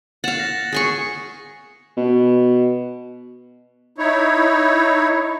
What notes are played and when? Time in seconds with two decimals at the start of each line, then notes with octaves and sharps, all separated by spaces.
0.24 F5 F#5 A6 E7
0.39 A#6
0.72 G#4 G#5 C#6
1.97 B2
3.98 D#4 E4 C#5